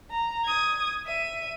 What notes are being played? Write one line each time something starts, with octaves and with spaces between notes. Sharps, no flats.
A#5
D#6 G#6
E5 D#7